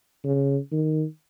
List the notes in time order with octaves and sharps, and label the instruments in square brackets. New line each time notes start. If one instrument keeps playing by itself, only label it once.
[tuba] C#3
D#3